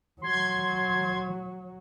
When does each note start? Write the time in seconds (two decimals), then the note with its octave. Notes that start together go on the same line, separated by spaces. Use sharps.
0.22 F#3 C6 G#6